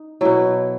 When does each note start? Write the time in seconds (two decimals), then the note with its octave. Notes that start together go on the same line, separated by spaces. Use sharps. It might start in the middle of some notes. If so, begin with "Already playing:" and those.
Already playing: D#4
0.21 B2 F#3 E4